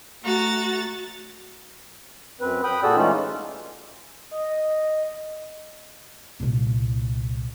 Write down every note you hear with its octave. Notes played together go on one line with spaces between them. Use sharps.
A3 F#4 A#5 A6
F#2 C4 B4
G5 B5 D#6
A#2 F#4 G#4 A4 D5 E6
E3 G#3 A3 C#4 D#4 F4
D#5
C2 A#2